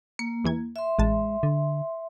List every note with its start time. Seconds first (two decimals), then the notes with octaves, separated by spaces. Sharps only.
0.19 A#3 C#7
0.44 E2 E3 G#6
0.76 E5 C6
0.99 A1 G#3 A5
1.43 D3